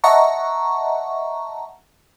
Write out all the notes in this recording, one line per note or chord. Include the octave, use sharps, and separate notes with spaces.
D#5 E5 F#5 A5 A#5 C#6